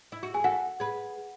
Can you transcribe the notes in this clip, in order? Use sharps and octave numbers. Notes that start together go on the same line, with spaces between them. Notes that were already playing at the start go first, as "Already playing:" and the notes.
E4
F#4
G#4 G#5
F#4 A4 F#5
G#4 B4